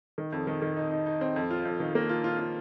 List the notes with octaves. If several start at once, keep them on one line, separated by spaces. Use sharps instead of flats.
D#3
F2
D#3
D#3
D#4
D#4
D#4
C4
F2
F4
F2
D#3
A#3
F4
F4
F4